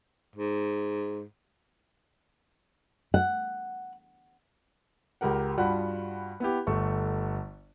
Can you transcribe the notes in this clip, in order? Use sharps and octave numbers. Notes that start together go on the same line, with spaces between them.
G#2
F#5
C#2 G4 A#4 F#5
G2 F4 F#4 F#5 B5 F#6
B3 E4 G4
G1 A3 C#6